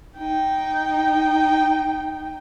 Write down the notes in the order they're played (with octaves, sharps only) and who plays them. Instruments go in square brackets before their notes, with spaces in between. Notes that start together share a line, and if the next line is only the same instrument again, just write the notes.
[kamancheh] D#4 G5